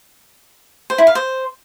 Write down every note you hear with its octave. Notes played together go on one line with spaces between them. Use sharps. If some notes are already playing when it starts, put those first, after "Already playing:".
C5
E4
F5
C5